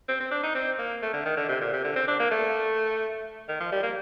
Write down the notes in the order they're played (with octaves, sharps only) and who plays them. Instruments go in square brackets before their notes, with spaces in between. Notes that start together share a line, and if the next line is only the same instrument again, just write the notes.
[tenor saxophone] C4
C4
D4
D#4
C4
A#3
A3
D3
D#3
D3
C3
A#2
C3
D3
C4
D4
A#3
A3
D#3
F3
G3
A#3